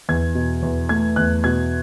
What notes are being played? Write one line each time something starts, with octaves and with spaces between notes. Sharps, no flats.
E2 G#6
B2
E2
A3 G#6
E2 F#6
B2 G#6